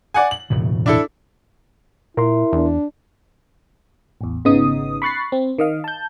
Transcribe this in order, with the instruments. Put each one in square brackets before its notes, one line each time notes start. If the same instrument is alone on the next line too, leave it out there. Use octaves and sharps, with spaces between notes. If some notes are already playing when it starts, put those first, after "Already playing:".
[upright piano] D5 F#5 G#5
F#7
[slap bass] E1 A2 C#3
[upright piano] D4 E4 A4
[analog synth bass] A#2 [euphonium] E4 [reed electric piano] A#4 C6
[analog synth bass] E2 [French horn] D4
[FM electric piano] A1 E2
G#1 C#3 B3 D#4 D#6
B5 C#6 F#6 A6 C7
C4
D#3 D#5 F5
A5 G6